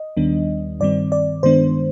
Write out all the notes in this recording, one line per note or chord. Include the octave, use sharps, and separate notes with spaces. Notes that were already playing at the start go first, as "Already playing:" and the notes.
Already playing: D#5
D#2 D#3 G3 B3 D4
G2 D#3 G3 C4 D5
D5
G2 D#3 G#3 B3 D4 C5